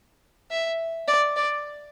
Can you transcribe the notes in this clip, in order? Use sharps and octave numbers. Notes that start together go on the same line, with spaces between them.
E5
D5
D5